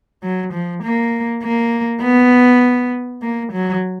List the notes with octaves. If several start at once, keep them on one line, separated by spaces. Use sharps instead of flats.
F#3
F3
A#3
A#3
B3
A#3
F#3